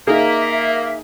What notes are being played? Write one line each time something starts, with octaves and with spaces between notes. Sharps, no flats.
A#3 D#4 G#4 E5